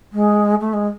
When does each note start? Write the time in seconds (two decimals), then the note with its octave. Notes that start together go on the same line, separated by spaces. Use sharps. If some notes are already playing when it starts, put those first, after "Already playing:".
0.12 G#3
0.60 A3
0.73 G#3